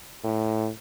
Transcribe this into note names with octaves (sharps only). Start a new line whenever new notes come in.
A2